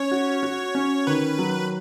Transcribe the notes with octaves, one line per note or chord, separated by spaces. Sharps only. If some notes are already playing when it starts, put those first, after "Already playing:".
Already playing: C#4 C#5
F#4
F#4
C#4
D#3 B4
F#3